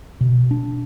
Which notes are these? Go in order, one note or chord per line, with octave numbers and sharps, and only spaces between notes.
B2
D4